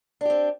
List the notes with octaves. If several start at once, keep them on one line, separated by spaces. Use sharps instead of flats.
C4 D4 G4